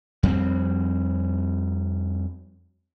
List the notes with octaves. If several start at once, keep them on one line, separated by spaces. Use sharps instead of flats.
F2 G3 B3 C4